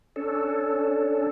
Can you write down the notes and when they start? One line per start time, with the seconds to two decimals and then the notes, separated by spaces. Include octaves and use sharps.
0.16 C#4 D4 A4